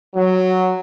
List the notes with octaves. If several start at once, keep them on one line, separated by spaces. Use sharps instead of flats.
F#3